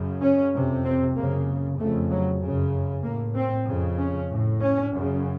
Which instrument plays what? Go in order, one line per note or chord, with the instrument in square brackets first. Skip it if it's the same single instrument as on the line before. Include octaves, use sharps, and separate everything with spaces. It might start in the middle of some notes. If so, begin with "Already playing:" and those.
Already playing: [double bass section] F#2 C#3
C#4
F2 C3
C4
F#2 C#3 A#3
F2 C#3 A3
F#3
F#2 C#3
A2 A#3
C4
F2 C#3
C#4
A2
C#4
F#2 C#3